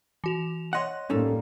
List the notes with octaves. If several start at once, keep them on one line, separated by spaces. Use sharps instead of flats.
E3 F#4 F7
C#5 D#5 F#5 C6 F#6
A2 G3 A#3 C#4 D#4 A4